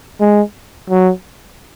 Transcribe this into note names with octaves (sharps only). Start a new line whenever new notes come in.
G#3
F#3